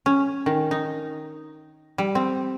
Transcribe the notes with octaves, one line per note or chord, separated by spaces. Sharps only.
C#4
D#3
D#4
G3
C4